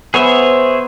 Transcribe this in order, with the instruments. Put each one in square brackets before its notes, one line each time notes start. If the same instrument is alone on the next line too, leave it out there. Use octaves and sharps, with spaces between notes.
[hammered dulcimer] B3 [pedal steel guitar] G#4 C#5 E5 [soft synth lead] C5